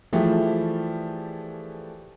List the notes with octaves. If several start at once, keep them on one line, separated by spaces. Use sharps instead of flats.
E3 F3 G3 A3 G4 G#4